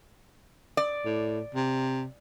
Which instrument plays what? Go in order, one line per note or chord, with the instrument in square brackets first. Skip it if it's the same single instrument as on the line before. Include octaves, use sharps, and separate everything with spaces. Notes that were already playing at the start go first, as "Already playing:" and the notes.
[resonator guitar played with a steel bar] D5
[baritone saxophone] A2
C3